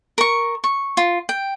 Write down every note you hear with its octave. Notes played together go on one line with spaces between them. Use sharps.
A#4 C#6
C#6
F4
G5